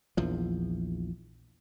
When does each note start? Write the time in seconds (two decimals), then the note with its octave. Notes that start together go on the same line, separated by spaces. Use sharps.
0.17 A#1 E2 F3